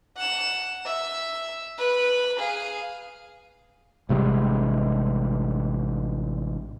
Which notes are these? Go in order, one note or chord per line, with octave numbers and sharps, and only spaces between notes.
F#5 E7
E5
B4
G#4 F5
A1 C3 G3 G#3